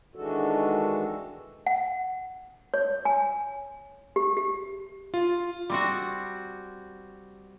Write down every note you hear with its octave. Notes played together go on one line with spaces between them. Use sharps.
D#3 E3 G#3 D4 F#4 A4
F#5
C#5
G#5
G4
G4
F4
G3 C4 F#4